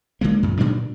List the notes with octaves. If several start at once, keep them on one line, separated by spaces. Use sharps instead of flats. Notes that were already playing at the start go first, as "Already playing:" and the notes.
D3 E3 G#3 A#3
F#2 A#2
A#2 D3 G3 D4